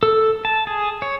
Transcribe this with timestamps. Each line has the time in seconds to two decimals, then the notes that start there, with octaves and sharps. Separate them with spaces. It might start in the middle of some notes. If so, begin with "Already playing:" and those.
0.03 A4
0.45 A5
0.67 G#4
1.02 C#5